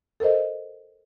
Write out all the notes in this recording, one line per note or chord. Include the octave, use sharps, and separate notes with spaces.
A4 A#4 C5 D#5